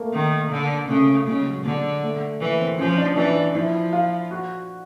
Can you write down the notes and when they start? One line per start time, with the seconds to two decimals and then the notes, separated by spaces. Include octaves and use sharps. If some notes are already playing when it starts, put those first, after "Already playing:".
Already playing: A3 A#3
0.13 D#3
0.51 D3
0.89 C#3 A3
1.27 C#3 G#3
1.47 F#3
1.65 D3 G#3
2.03 A3
2.41 E3 A#3
2.60 C4
2.79 F3 C#4
2.98 D4
3.17 E3 D4
3.36 D4
3.55 F3 E4
3.93 F4
4.31 F#4